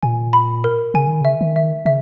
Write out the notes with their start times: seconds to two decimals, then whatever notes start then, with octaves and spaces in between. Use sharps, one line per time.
0.03 A#2 G#5
0.33 B5
0.64 A#4
0.94 C#3 G#5
1.07 D#3
1.21 C#3 E5
1.41 D#3
1.56 E5
1.85 C#3 E5